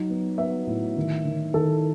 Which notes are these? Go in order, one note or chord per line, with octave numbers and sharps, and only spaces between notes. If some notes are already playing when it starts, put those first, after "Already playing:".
Already playing: F#3 D#4
B3
B3 E5
A2
D#3
D#3
D#3 A4